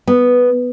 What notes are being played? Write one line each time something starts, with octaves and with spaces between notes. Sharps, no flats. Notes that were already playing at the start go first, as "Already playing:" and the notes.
B3